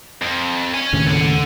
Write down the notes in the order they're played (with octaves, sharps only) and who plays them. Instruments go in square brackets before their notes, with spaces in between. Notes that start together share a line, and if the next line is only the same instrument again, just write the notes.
[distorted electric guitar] F2
C#5 G#5
[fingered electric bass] D#2 A2 C#3
[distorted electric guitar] A4 F#5